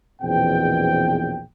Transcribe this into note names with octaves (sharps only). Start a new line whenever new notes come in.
A#1 E2 B2 C4 G#4 G5